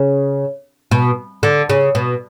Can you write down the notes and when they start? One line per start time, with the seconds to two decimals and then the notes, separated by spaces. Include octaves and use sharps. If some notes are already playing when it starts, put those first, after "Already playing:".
Already playing: C#3
0.91 B2
1.43 D3
1.70 C#3
1.95 B2